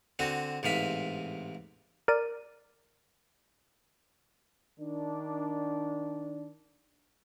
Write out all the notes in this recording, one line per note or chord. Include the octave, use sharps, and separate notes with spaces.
D3 C4 F#4
A1 G#2 C3 F5 B5
A#4 D5 D#7
D#3 D4